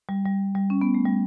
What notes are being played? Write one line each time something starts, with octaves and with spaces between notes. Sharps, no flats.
G3
G3
G3
C#4
B3
A3
G3